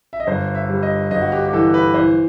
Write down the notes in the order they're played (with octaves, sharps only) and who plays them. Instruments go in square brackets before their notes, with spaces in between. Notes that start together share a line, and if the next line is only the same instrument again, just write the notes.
[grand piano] E5
D#5
[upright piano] G1 [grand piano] C5
[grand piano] E5
[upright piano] G3
[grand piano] D#5
[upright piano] G1 [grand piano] D#5
[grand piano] F#4
G4
G4
[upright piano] E3 [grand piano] A4
[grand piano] B4
[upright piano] E3 [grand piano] C5